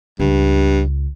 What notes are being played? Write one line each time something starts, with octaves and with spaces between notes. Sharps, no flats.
C#2 G2